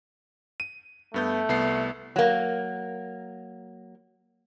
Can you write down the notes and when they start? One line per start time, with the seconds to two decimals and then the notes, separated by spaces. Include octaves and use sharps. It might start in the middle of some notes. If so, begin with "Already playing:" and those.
0.60 D#7
1.14 G2 A3 B3 G6
1.49 C2 B3 C7
2.16 F#3 A#3